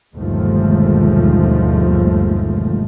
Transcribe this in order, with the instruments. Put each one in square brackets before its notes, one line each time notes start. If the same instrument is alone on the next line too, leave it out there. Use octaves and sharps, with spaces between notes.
[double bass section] G1 D#2 B2 F3 G#3 A3